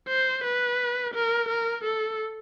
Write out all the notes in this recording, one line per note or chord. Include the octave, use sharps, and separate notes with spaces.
C5
B4
A#4
A#4
A4